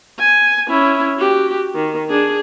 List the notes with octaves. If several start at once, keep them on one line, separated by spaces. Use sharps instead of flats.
G#5
C#4 E4
F#4 G4
D#3
D4 G#4